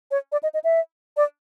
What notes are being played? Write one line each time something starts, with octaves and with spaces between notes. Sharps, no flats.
C#5
D5
D#5
D#5
E5
D5